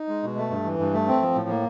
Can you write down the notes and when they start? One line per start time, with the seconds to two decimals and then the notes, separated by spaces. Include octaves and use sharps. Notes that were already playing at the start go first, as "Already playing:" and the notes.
Already playing: D#4
0.09 G#3
0.23 B2
0.37 A3
0.51 G2
0.64 E3
0.79 G2
0.94 A3
1.08 C4
1.22 F3
1.35 A2
1.49 A#3